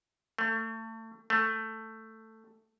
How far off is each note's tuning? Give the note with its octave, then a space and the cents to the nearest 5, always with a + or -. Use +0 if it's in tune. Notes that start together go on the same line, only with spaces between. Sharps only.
A3 +30
A3 +10